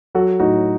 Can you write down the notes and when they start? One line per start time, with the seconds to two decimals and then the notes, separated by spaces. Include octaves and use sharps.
0.15 F#3 F#4 A4
0.40 A2 D#4 F#4